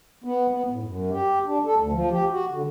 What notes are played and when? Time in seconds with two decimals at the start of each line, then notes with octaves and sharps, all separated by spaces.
0.24 B3
0.50 B3
0.70 A2
0.83 F#2
1.11 G4
1.46 D4
1.65 A4
1.78 D2
1.93 F3
2.11 G4
2.30 F#4
2.52 D3